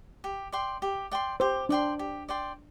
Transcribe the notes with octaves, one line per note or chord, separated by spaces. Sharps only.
G4
D5 G5 C6
G4
D5 G5 C6
G4 C5
D4 D5 G5 C6
G4
D5 G5 C6